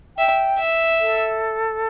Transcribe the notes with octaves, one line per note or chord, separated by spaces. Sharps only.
E5 G5
E5
A4